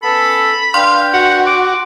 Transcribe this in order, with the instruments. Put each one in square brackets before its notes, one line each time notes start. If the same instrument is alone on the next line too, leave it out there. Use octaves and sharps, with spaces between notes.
[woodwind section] B3 C#4 A4 [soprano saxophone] B5
[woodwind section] D4 B4 G5 [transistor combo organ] F5 [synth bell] C6
[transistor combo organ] F#4 [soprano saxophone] F#5
[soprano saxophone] D6